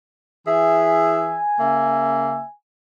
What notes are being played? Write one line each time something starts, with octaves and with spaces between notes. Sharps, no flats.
E3 G#4 E5 G#5
C#3 A#3 E5